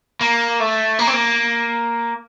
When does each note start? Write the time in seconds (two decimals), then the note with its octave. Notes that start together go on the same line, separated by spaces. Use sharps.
0.21 A#3
0.60 A3
0.99 A#3
1.07 C4
1.14 A#3